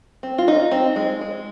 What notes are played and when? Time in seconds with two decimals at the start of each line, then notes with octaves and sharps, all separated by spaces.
0.23 C4
0.38 F4
0.48 D#4
0.71 C4
0.96 G#3
1.21 G#3